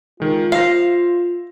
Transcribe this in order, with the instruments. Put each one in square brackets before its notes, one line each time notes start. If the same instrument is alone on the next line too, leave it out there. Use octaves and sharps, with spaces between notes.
[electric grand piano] D#3 G#3 [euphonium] F4
[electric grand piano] C5 E5 A#6 [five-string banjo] F5